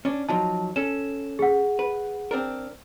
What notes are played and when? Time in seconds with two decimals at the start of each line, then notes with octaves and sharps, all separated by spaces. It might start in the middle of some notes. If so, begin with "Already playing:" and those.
0.05 C#4 D4
0.29 F3 F#3 D#4 A5
0.76 C#4 A4 E7
1.39 G#4 F#5
1.79 B4
2.31 C4 D4 A#4